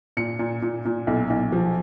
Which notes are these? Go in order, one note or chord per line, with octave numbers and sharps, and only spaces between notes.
A#2 C#7
A#2
A#2
A#2
B1
B1
F3